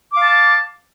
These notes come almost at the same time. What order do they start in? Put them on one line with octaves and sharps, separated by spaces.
D6 F5 A5